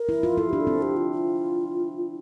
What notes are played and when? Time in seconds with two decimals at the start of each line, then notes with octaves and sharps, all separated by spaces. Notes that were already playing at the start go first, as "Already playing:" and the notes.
Already playing: A#4
0.09 E4
0.23 F4
0.38 E4 A4
0.49 D4 G4
0.60 A4
0.67 C4
0.82 G4
0.97 F4
1.12 F4